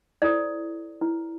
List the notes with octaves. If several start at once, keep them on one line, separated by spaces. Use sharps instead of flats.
E4 A4 C5 D5
E4 B4